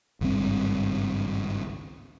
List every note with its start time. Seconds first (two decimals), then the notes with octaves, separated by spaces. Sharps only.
0.21 G#1 C#2 G2 C4